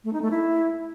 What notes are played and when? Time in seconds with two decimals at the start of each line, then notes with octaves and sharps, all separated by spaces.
0.04 A3
0.13 D#4
0.22 A3
0.31 E4